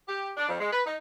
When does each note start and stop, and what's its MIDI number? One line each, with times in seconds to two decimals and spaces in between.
0.08 0.31 67
0.37 0.45 62
0.49 0.59 41
0.60 0.70 56
0.73 0.82 71
0.86 0.97 63